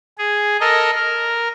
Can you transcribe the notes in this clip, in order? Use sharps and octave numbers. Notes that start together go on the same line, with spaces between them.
G#4
A4 A#4 D#5
A#4